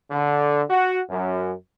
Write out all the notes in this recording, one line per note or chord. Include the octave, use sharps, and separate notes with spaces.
D3
F#4
F#2